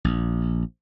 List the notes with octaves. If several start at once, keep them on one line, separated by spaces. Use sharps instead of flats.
A#1